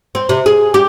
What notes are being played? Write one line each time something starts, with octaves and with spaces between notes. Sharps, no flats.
C4
C3
G#4
G4